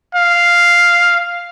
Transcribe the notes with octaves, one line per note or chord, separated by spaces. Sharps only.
F5